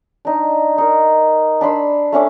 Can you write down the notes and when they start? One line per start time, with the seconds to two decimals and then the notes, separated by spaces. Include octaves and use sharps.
0.25 D4 D#4
0.78 D#4 A#4
1.61 D4 B5 C6 E6
2.12 A3 C#4 D4 D6